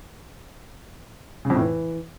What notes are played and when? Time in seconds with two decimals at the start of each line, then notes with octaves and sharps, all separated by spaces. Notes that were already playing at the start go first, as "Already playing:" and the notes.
1.45 C#3
1.50 F2
1.55 A2
1.61 E3